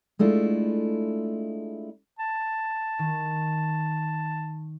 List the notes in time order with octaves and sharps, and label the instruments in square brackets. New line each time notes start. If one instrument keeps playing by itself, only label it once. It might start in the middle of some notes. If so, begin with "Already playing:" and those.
[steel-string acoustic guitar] G#3 A3 D4 E4 F4
[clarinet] A5
[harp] D#3